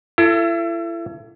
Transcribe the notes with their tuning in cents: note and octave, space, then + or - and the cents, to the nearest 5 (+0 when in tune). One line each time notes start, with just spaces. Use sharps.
E4 +35 A4 +15